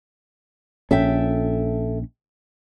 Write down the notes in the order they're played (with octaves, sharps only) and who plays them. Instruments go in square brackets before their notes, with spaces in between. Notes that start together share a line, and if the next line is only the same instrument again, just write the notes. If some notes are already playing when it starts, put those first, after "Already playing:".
[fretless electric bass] A#1 C#4 [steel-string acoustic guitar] A4 E5 G5